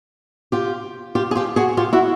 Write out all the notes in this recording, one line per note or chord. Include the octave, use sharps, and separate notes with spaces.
F4 G4
F4 G4
G#4
F4 G4
F#4 G#4
F4 G4
E4 F#4